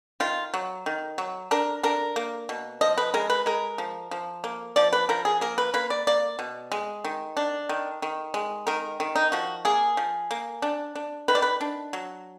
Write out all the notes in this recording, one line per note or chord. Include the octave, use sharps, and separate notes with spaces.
D#3 F4
F#3
D#3
F#3
D4 A#4
D4 A#4
A#3
B2
F3 D#5
B4
G#3 A#4
B4
G#3 A#4
F3
F3
A#3
F3 D5
B4
F3 A#4
G#4
A#3 A#4
B4
A#3 B4
D5
A#3 D5
B2
G#3
D#3
D4
D#3
D#3
G#3
D#3 A#4
D#3
D#4
F3 F#4
A#3 G#4
F3
A#3
D4
D4
D#3 B4
D5
B4
D4
F#3